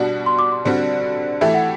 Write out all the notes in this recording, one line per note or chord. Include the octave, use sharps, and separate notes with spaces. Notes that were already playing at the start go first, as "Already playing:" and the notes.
Already playing: B2 G3 D4 F#4
C6
D6
C6
D3 G3 C4 F#4 D5
E3 A3 E4 G4 E5
F#5